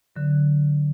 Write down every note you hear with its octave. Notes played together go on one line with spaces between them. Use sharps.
D3 F#3